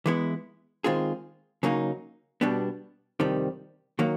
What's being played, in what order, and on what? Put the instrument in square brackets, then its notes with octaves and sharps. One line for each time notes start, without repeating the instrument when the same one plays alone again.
[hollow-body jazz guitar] E3 G#3 B3 E4
D#3 G#3 C4 F4 G#4
C#3 F#3 A#3 D#4
B2 G3 B3 D4
F2 C3 D#3 G3
D#3 F#3 A#3